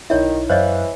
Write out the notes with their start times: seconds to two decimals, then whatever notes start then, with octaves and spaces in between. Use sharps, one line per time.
0.10 B1 D#3 D#4 E4 C#5 E5
0.50 F#2 E3 C5 C#5 D#5 F5 F#6